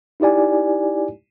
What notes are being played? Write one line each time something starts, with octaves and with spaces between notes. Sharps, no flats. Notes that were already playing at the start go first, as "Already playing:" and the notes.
D#4 E4 G4 D5 G#5